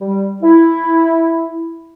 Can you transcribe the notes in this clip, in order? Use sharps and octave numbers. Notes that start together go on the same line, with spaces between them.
G3
E4